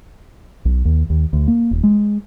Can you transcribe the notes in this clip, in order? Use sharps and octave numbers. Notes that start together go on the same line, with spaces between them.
B1
D#2
D#2
D2
A#3
D#1
G#3